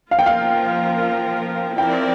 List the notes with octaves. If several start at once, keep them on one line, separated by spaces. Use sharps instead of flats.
F3 A#3 F4 A#4 F5
G5
F5
F3 C4 E4 A#4 D5 G5